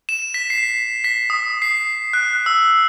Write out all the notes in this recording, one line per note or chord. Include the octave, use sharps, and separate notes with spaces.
E7
B6
C7
B6
D#6
C7
F#6
E6